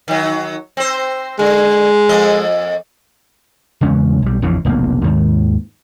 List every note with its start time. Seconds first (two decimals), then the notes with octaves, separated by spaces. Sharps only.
0.08 D#3 F#3
0.77 C4 C5
1.39 D3 G#3
2.09 F2 A#3 D#5
3.81 E2 C#3 G#3 C#4
4.22 B1 G3
4.42 A#1 F2 C#3 E3
4.65 F1 B1 E2 A#3
5.04 D#2 G#2 D#3